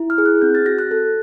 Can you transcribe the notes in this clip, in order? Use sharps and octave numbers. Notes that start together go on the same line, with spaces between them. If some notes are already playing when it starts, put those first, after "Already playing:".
Already playing: E4
F6
G#4
F#6
C4 G6
A6
F#4 A#6
F#6
A4